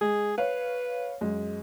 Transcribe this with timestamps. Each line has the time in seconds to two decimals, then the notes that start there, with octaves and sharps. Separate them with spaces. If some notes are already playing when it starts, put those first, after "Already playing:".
0.01 G#3 G#4
0.38 B4 C#5 F5
1.21 F#2 G#3